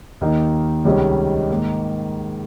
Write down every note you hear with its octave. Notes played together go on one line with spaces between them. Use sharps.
D#2 D#3 A#3 D#4
C#2 C3 D#3 G3 C#4
G#2 D#3 A#3